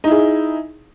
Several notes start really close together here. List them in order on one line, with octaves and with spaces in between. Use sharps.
D#4 E4 G#4